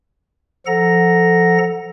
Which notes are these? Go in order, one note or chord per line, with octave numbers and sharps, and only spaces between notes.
F3 A4 F#5 A#5 A#6